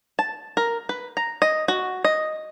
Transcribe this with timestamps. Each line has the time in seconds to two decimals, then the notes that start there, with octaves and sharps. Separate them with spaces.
0.19 A5
0.57 A#4
0.89 B4
1.17 A#5
1.42 D#5
1.68 F#4
2.05 D#5